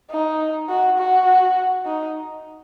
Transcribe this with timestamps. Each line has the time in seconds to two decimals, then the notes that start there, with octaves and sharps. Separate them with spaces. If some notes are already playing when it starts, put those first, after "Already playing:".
0.11 D#4
0.69 F#4
0.98 F#4
1.85 D#4